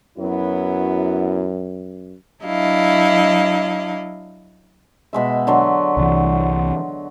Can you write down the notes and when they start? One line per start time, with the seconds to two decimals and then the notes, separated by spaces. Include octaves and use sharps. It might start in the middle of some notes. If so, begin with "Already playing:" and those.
0.18 F#2 F#3 B3 E4
2.42 F#3 D4 E4 D#5 F5
5.13 B2 G#3 E5
5.47 D3 F#3 C6
5.97 C2 E3